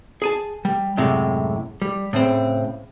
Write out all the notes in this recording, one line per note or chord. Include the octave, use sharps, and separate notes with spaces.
G#4 G#5 A5
G3
F#2 A2 C3 G#3
G3
A2 C#3 C4